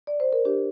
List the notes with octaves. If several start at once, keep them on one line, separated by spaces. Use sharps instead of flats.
D5
C5
A#4
D4 G4